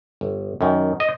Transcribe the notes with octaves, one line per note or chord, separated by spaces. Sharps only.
G1
F#2 D#3
D#5